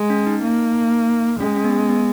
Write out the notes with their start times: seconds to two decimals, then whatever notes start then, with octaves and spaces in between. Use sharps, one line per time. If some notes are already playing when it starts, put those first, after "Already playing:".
Already playing: G#3
0.10 C#4
0.27 D#4
0.43 A#3
1.40 G#3 C#4
1.56 C#4
1.64 B3
1.89 B3